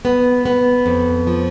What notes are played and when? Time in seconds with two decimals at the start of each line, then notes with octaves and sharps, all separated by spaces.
0.05 B3
0.46 B3
0.86 F2
1.27 F3